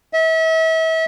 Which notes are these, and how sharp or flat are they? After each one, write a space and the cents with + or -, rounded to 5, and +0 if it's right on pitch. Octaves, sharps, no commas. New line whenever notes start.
E5 -35